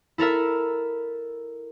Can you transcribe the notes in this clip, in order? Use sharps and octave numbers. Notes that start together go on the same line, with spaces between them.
E4 A4 A#4 E5